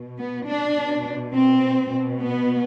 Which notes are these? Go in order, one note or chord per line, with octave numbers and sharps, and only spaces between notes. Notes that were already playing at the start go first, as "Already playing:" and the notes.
Already playing: B2
B3
D4
B2
C4
B2
B3